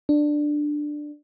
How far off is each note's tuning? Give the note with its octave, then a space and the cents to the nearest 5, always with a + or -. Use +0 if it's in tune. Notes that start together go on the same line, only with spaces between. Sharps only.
D4 +10